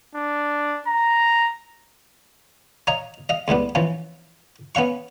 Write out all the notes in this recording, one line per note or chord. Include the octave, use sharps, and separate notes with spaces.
D4
A#5
C#5 D#5 F5 A#5
D#5 F5
C#2 A2 G3 B3
E3 F3 C#4
B3 C#4 F5 C#6